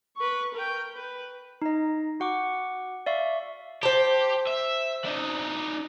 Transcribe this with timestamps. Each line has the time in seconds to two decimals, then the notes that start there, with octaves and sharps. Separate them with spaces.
0.17 B4 C#6
0.54 A#4 G5
0.94 B4
1.62 D#4 D#5
2.20 F#4 F#5 C#6 D6
3.06 D5 E5 F5 C#6
3.83 G4 C5 A5
4.47 E5
5.05 D4 D#4